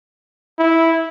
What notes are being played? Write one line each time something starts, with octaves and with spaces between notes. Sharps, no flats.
E4